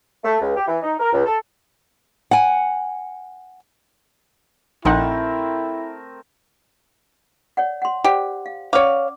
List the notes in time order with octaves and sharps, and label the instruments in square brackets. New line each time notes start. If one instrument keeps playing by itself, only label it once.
[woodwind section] A3
C#2
G4
E3
D#4
A#4
C#2
A4
[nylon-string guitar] F#5 G#5
[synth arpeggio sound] A#1 D#4 F#5 [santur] A3 C4 A#4 [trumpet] E4
[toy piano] C#5 D5 F#5
F#5 C6
[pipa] G4 [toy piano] C5 D5 F#5
[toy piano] F5
[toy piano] C#4 D5 D6 [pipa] C#5 F5